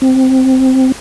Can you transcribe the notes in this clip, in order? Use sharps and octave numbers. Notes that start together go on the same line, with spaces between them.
C4